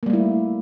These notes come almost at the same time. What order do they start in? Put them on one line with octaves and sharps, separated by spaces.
A#3 G3 A3 E4